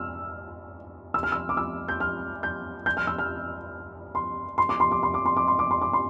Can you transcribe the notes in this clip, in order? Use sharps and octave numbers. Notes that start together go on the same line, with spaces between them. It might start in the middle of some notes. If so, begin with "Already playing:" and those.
Already playing: E6 F6
E6
F6
E6
D6
E6
G6
F6
G6
G6
F6
E6
F6
C6
C6
D6
C6
D6
C6
D6
C6
D6
C6
D6
C6
D6
C6